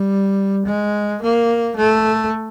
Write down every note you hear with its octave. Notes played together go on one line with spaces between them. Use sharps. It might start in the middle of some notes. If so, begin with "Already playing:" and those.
Already playing: G3
G#3
A#3
A3